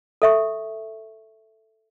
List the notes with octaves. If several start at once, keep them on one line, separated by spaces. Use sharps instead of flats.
A4 E5 C#6